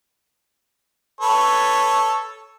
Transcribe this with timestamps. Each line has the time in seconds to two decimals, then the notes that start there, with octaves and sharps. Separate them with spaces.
1.21 A4 B4 C#5